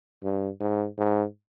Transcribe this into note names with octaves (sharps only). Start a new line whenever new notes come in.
G2
G#2
G#2